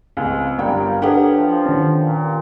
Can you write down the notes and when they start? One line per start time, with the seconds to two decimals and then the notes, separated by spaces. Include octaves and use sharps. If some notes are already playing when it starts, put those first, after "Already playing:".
0.17 C#2 C4
0.58 G1 G3 A#4 G5
1.02 D4 G4 A4 B4 C#5 F#5
1.37 F3
1.66 D#3 C#4
2.02 A#2